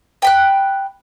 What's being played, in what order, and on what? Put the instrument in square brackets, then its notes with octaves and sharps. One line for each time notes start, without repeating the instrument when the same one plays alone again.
[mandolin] G5 B5 F#6